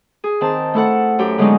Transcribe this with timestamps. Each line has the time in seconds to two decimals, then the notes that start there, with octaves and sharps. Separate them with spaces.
0.24 G#4
0.41 D#3 C4 A5
0.74 A3 E4 A4 F#5
1.19 F#2 G4
1.38 D3 F#3 G#3 B3 C#4 D#4